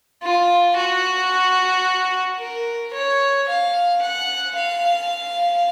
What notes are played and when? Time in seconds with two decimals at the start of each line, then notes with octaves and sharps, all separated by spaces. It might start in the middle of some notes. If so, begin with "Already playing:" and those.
0.23 F4
0.77 F#4
2.39 A#4
2.94 C#5
3.49 F5
4.02 F#5
4.56 F5